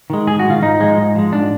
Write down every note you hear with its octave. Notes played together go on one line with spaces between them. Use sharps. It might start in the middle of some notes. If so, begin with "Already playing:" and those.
D#3 G#3
G#2 G#4
F#4
G#3
D#3 F4
G#2 D#4
F3 G#3
G#2
F3 G#3
G#2 D4